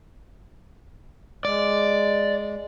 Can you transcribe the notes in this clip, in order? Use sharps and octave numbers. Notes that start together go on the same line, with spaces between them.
G#3 D5